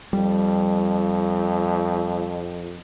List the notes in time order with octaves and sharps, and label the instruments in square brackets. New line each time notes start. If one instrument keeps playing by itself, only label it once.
[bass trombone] F2 [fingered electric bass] G3